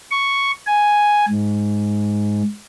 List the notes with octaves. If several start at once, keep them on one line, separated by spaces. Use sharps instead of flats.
C#6
G#5
G#2